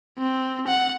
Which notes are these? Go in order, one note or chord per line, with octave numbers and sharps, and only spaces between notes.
C4
F#5